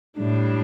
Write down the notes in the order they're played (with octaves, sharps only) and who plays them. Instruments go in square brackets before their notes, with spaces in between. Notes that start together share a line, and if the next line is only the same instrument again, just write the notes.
[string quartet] A2 G3 D4